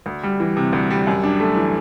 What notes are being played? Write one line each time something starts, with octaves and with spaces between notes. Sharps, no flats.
D2
G3
E3
C3
D2
G3
F#2
D4
A3
E3